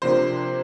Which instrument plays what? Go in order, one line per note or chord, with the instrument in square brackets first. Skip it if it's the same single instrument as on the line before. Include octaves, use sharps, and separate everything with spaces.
[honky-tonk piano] C3 F3 A#3 D4 C5